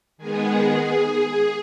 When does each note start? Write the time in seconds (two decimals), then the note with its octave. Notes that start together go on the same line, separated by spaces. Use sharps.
0.18 D#3 G#3 B3 G#4